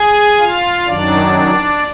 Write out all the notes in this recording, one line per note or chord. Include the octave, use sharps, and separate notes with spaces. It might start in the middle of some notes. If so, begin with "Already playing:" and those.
Already playing: G#4 G#5
F4 F5
F#2 D#3 F#3 D4 D5